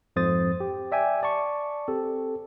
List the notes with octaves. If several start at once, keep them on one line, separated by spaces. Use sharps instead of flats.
F2 G#2 C5 D#6 A6
G4
D5 E5 G5 G#5
D5 A5 C#6
C4 G4 A4